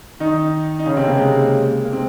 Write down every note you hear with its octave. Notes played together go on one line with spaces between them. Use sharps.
D#3 D#4
D#4
C#3 C#4
C3 C4
A#3
G#3
A#3
C3 C4